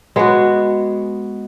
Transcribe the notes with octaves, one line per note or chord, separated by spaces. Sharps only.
G#3 B3 F#4